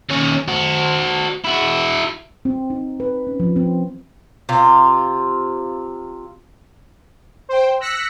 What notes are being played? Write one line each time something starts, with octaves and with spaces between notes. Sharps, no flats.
D#2 C#4
F#4 C5
E4 F#4
C4
D#4
B4
C#4
F3
C4
C3 F4
C5 G5
E6 F#6 A#6 B6 C#7